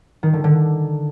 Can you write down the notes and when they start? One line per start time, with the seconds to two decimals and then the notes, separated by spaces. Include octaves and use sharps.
0.23 D#3
0.33 D3
0.44 D3